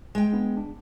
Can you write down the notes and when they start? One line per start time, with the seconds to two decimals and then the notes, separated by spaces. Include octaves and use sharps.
0.15 G#3 G5
0.33 B3 D4
0.57 D4